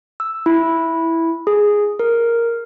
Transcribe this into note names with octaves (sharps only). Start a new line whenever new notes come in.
E6
E4
G#4
A#4